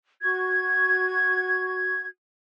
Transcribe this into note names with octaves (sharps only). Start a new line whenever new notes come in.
F#4 G#6